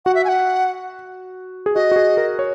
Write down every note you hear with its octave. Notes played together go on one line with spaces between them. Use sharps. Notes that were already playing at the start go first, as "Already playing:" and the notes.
F#4 F#5
E5
G#5
F#5
G#4
F#4 D#5
F#4
G#4
A#4
C#5